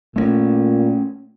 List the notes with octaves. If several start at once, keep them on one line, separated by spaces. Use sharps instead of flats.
A#2 A3 B3 C#4